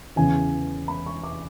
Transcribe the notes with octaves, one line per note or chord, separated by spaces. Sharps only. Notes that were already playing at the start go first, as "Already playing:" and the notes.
E2 C#3 E3 G#5
B5
C#6
D6